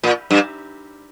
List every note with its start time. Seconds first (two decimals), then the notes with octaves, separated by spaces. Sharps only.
0.03 A#2
0.31 G2